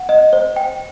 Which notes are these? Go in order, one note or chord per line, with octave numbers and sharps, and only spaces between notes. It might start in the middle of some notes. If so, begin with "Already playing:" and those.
Already playing: F#5
D#5
C5
G5